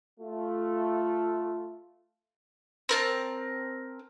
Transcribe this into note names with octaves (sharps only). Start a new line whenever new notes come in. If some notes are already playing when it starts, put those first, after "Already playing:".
A3 F4
C4 A#4 A5